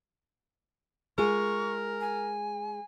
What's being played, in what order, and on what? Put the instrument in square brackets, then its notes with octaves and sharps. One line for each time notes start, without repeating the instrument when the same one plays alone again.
[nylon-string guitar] G#3 F4 G#4 [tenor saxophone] A#4 [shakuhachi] C#6
[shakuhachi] G#5